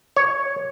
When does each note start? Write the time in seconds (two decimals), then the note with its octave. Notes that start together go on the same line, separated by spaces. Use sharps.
0.16 C#5